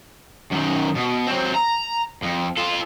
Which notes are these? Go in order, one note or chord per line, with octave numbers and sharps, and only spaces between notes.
F#2 D#3
B2
F#3 C4
A#5
F2
F4 A4